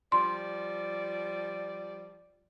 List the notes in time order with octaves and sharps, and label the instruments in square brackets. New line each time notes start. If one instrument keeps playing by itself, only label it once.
[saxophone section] F3 G3 D5 [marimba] C6